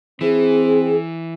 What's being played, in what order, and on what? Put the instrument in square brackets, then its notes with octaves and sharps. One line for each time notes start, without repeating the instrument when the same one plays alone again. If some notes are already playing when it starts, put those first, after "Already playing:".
[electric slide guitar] E3 [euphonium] C4 [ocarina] G#4